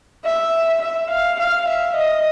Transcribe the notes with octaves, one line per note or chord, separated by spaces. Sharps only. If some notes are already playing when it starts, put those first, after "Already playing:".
E5
E5
F5
F5
E5
D#5